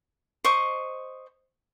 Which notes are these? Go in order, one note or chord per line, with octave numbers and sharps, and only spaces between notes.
C5 D#5 C#6 D6